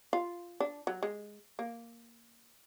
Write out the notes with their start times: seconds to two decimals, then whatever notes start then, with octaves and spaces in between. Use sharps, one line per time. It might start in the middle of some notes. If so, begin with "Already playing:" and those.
0.13 F4
0.60 D4
0.87 F#3
1.03 G#3
1.59 A#3